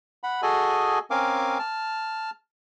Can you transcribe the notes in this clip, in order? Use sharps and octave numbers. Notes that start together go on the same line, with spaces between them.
F#5 B5
F#4 G#4 A4 D#5 G#5
C4 C#4 A#4 F5 G#5 D6
A5 F6